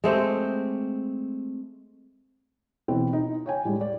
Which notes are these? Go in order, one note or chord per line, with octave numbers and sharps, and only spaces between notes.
G#3 A3 C4 G4
B2 E3 C4
D#4
C#5 G5 G#5
A2 G3 G#3
D5